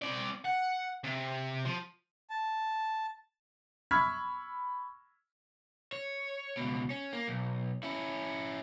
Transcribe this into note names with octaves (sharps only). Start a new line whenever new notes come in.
C4 D5
F#5
C3
F3
A5
B5 C#6 E6 F6 G#6 B6
C#5
C#2 B2
C#4
A#3
B1
C#4 E4